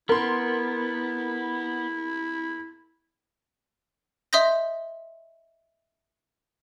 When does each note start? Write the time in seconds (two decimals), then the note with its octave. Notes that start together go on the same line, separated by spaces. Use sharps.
0.09 B3 E4 A#4 C6
4.33 D#5 E5 C6 D#6 G6 A#6